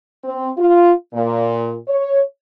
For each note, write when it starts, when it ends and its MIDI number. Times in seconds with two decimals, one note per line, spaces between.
0.24 0.50 60
0.58 0.92 65
1.14 1.75 46
1.88 2.21 73